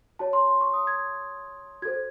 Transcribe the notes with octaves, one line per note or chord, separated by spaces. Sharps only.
F#4 C#5 A5
C6
C6
C#6
D#6
G#6
F#4 A4 C5 G#6